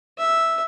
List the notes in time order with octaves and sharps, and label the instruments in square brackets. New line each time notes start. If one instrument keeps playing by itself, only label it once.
[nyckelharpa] E5